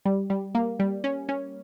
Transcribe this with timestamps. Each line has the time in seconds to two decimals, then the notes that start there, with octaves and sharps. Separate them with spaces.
0.05 G3
0.30 G3
0.55 A#3
0.79 G3
1.04 C#4
1.29 C#4